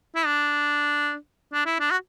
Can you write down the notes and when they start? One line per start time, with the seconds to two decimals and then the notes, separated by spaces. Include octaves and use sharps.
0.16 E4
0.26 D4
1.53 D4
1.66 E4
1.80 D4
1.92 F#4